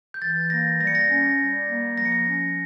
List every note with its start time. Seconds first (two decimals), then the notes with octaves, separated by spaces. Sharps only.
0.14 G6
0.21 E3 A6
0.50 A#3 A#6
0.80 G3 A#6
0.87 C#7
0.95 A#6
1.09 C#4
1.39 G3
1.68 A#3
1.98 F3 A#6
2.05 C#7
2.12 A#6
2.27 C#4